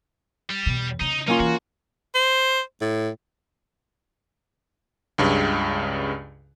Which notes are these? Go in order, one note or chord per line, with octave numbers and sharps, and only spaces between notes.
G3
E2 B2
C#3 D#4
A#3 C#4 D#4 F4
E3 F#4
C5
A2
C#2 G2 C#3